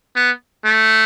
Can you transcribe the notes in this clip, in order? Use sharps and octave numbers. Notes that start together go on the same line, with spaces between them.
B3
A3